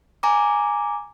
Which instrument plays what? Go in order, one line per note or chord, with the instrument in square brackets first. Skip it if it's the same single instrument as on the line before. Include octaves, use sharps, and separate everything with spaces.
[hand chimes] G#5 A#5 D6